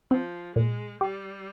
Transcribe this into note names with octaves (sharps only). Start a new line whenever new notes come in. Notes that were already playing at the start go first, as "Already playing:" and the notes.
F3 C4
A#2 G#3
G3 G4